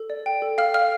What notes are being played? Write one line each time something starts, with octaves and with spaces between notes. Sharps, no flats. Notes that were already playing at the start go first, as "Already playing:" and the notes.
Already playing: A4
D5
G5
A4
A4 F5 F6
D5 F5 F6